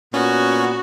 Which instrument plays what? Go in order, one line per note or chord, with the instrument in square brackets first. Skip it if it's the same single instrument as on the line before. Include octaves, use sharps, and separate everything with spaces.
[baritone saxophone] A#2 [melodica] B3 [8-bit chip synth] C#4 [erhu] F#4